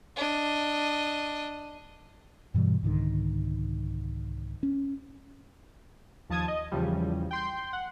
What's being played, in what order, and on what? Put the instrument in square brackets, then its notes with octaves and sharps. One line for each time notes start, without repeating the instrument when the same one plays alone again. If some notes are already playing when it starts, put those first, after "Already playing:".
[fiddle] D4 D#5
[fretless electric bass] G2 B2 E3 G3
C2 G#2 D3 D#3
C#4
[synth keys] D#2 F3 A5 D#6 G#6
D#5
E2 C#3 F3 G3
G5 C6 G6
F#5